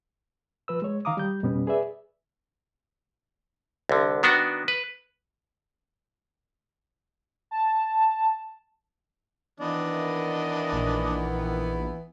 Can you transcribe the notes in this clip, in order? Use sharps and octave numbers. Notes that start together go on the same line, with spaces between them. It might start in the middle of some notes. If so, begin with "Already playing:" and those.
F3 B4 E6
G#3 C#5
D#3 F5 A#5 D6 D#6
G3 G6
F2 B2 G3 B3 C#4
G#4 B4 D5 E5
C2 D3
D#3 B3 D4 F#4
B4
A5
D#3 E3 B3 D4 D#5
A#1